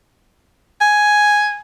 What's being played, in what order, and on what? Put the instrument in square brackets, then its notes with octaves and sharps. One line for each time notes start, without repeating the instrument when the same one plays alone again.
[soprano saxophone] G#5